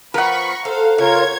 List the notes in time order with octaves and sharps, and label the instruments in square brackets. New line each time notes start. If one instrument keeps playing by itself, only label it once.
[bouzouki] F3 B3 [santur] A#4 F#5 [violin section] B5 C#6
[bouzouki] A4 [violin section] C5 F5
[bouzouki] C#3 [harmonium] F4 A#4 [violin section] C#5 G#6